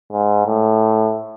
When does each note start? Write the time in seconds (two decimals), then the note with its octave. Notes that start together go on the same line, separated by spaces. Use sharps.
0.13 G#2
0.47 A2